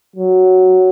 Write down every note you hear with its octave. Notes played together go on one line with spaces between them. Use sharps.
F#3